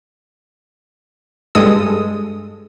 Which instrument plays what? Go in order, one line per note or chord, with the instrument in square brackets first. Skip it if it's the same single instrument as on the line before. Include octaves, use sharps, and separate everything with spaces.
[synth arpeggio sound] G2 G#3 A4 D#6